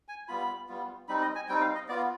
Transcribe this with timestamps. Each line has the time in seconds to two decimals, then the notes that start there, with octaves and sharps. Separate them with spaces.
0.08 G#5
0.28 G3 B3 F4 B5
0.69 G3 B3 F4
1.08 G3 C4 D#4 B5
1.22 D#5
1.35 G#5
1.49 G3 C4 D#4 G5
1.61 F5
1.74 D#5
1.89 B3 F4 D5